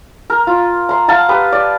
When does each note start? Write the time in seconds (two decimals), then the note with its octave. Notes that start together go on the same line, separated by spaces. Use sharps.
0.30 A#4
0.47 F4
0.89 A#5 C6
1.08 F5 F#5 A5 A#5
1.29 G4 B4 D#6
1.52 D5